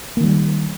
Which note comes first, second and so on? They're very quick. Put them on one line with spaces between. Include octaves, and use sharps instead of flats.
A#3 D#3 G3